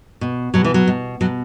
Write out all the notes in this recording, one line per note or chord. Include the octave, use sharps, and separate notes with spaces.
B2
B2 F#3
E3
F#3
B2
B2 F#3